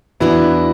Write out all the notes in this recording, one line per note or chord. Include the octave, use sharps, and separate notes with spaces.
E2 E3 B3 D4 E4 F#4